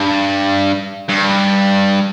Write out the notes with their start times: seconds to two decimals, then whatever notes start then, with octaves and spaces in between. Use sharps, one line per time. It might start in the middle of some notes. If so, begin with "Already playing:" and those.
Already playing: G2
1.09 G2